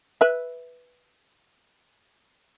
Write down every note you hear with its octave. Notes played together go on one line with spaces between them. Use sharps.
B4 E5